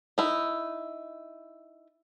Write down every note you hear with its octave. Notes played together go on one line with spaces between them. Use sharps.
D#4 E4